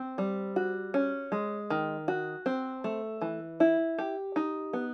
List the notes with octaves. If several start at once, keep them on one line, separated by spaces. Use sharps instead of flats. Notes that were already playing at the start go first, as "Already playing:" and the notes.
Already playing: C4
G3
F#4
C#4
G#3
D#3
F#4
C4
A3
E3
E4
G4
D#4
B3